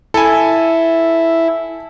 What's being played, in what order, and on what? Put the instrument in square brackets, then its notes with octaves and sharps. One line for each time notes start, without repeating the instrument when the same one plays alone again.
[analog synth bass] E4 [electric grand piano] A4 G#5